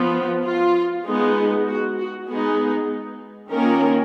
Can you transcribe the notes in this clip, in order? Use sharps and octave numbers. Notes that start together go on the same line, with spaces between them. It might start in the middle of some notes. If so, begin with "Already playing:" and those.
Already playing: F3 B3 F4
F4
G#3 B3 D#4
F#4
F#4
G#3 B3 D#4 G#4
D#3 A#3 C#4 F4 A#4